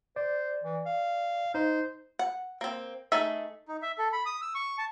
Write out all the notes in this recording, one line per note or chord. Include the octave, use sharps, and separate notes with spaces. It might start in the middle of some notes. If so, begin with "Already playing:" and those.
C5 D5
E3
F5
D#4 C5
F#5
A#3 C4
A3 D#4 G#4 E5
D#4
E5
A4
B5
D#6
E6
C#6
A5